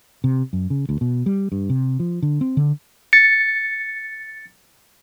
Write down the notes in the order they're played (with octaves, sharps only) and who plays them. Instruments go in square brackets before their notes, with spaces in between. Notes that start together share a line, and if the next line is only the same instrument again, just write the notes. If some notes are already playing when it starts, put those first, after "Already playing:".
[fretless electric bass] C3
F#2
C#3
D2
B2
G3
G2
C3
F3
D3
C4
D3
[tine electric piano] A6 C#7